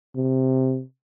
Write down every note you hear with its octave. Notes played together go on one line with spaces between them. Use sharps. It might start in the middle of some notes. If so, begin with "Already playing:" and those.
C3